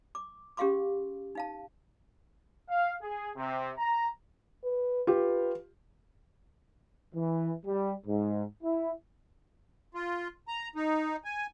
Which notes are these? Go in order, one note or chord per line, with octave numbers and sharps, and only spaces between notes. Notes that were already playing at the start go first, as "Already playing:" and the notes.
D6
C#4 G4 G#4 F5 C6 D6
D#4 F5 A5
F5
G#4
C3
A#5
B4
F4 G4 B4
E3
G3
G#2
E4
F4
A#5
D#4
G#5